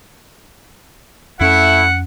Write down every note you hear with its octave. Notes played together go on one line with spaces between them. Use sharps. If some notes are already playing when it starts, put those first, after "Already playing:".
F2 A3 C#4 E4 F#5